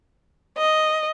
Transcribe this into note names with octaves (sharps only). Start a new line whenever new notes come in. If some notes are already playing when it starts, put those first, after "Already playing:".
D#5